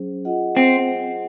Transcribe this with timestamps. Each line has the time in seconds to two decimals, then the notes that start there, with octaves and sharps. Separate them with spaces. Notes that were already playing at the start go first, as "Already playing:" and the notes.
Already playing: F#3 C#4 G#4 C5
0.25 F4 G#4 D#5 F#5
0.57 C4